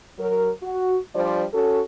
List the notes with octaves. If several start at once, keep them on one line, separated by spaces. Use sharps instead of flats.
F#3 A#4
F#4
F3 G3 D4 C5 D5
C#4 F#4 A4